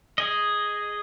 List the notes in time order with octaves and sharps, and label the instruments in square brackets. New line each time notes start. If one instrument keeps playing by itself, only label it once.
[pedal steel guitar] G#4 D#5